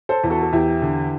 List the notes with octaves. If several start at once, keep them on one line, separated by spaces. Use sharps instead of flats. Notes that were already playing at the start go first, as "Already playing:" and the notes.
A4 C5
E2
F#4 A4
A4
E2 E4 G4
D3